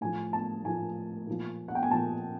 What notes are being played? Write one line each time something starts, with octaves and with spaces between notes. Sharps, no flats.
A2 F3 G#5
A5
A2 F3 G#5
A#2 F3
F#5
G5
G#5
A#2 F3 A5